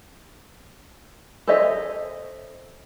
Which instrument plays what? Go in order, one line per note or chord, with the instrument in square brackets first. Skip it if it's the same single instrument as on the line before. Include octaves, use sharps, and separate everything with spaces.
[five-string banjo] A4 C5 C#5 D#5 E5